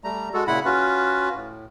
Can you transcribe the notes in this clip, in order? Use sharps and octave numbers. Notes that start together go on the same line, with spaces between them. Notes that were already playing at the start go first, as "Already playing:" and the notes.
G3 A3 A#5
G#3 F#4 A4
A#2 C#3 E4 F#5 B5
C#4 F4 F#4 B4
A2